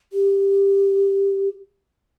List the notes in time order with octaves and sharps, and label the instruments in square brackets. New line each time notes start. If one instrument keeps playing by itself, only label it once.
[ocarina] G4